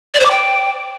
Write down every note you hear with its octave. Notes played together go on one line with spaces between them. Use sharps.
D5
C5
D6
G5